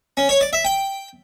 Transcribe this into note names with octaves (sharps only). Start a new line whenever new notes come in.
C#4
C#5
D5
E5
G5